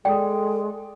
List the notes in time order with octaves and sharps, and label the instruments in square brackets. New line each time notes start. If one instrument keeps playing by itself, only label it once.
[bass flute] G#3 [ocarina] A4 [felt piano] D5 D#6 [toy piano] G5